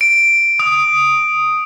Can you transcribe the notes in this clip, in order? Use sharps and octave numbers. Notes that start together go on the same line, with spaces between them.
D7
D#6